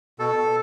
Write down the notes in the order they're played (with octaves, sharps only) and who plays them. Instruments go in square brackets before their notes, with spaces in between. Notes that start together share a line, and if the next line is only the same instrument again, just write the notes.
[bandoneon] B2 A4